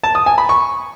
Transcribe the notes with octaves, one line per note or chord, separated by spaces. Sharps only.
A5
D#6
G#5
B5
C#6